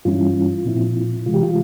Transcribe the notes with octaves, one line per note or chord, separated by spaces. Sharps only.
G2 E3 G3 C#4 E4 F4
A#2 F3 C4 E4
C3 E3 G#3 F4
G4
F4